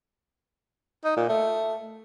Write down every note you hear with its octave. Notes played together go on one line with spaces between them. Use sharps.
D#4
A#2
A3